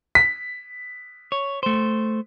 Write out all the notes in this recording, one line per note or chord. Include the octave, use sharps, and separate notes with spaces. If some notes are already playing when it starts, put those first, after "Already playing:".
B6
C#5
A3 C5